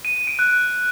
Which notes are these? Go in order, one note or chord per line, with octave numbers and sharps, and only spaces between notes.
D#7
D#7
D7
F#6